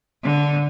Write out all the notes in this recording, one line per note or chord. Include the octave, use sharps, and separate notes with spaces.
D3